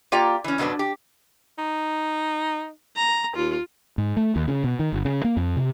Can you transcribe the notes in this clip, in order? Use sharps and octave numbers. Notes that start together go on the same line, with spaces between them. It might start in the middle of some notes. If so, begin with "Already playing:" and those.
A#3 F4 G4 D5 G5 A#5
E3 C#4
F2 B2 F#3 B3 D4
G4
D#4
A#5
D#2 F4
G#2
A3
D#2
C#3
B2
D#3
G1
C#3
A#3
F2
C3